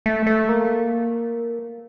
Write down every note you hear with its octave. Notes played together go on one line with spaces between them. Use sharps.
A3
A3
A#3